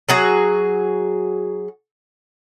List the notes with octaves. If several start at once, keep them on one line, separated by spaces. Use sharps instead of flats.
F#3 F#4 G#4